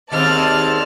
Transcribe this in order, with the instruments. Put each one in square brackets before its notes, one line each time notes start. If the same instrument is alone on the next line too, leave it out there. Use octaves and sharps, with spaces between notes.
[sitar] D#2 G#3 C4 [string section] D5 A5 F6